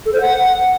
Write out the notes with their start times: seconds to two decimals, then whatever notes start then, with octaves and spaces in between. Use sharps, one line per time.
0.06 A4
0.13 C5
0.21 F#5